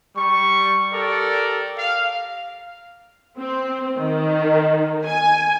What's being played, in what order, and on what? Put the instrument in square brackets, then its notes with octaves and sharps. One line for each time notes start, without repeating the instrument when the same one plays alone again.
[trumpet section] G3 C#6
G4 A4 A#4 D5
F5
[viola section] C4
D#3
G#5